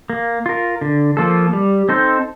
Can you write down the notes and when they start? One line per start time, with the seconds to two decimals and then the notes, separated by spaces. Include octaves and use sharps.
0.10 A#3
0.46 F4 A#4
0.81 D3
1.17 F3 A#3 F4 A4
1.53 G3
1.89 C4 D#4 A4 C5